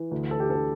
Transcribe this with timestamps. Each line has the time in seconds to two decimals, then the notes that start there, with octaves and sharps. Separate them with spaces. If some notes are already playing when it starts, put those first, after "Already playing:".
Already playing: E3
0.11 D2
0.31 A4
0.40 G4
0.49 D3 A4